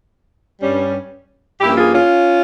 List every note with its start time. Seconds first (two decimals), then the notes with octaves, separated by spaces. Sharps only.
0.61 G2 G3 C#4
1.60 G2 F3 A#3 C#4 E4 G4
1.77 F4 G#4
1.94 C#4 F4